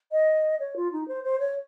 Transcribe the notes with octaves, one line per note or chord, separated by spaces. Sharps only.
D#5
C#5
F4
D#4
C5
C5
C#5